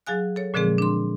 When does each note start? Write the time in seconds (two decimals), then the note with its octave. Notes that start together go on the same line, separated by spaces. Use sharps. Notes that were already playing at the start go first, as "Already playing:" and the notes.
0.07 F#3 G#4 F5 G#5 F#6
0.36 A4 C#5
0.54 A#2 D3 F3 G#3 C4 G#4
0.78 D4 C6